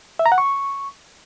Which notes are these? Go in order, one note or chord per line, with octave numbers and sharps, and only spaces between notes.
E5
A#5
F#5
C#6